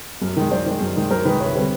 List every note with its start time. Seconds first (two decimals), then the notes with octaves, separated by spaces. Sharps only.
0.22 F#2
0.37 D#3 G#3
0.51 F#2 C5 D5
0.66 D#3 G#3
0.81 F#2
0.96 D#3 G#3
1.10 F#2 A#4 C5
1.25 D#3 G#3 B4
1.40 F1 B4 C#5
1.55 D3 G3 C4